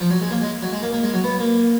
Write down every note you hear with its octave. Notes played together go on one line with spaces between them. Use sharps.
F3
F#3
G#3
A#3
G#3
F#3
G#3
A#3
A#3
G#3
F#3
B3
A#3